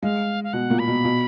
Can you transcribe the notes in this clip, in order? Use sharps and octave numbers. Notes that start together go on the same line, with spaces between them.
G#3 F5
F5
B2 F#5
A#2
B5
B2
B2